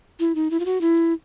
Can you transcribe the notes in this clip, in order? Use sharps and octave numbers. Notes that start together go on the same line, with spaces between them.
E4
D#4
E4
F4
F#4
E4